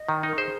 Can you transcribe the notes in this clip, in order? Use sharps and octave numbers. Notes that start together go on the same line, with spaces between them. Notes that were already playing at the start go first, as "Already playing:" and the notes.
Already playing: D#5
D#3
D#4 A#4
G#4 C5